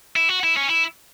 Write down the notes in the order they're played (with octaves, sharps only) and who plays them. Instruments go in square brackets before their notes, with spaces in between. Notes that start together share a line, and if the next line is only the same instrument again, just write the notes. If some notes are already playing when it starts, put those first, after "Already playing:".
[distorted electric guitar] E4
F#4
E4
C#4
E4